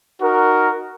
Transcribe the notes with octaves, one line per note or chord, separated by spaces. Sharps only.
D#4 F#4 A#4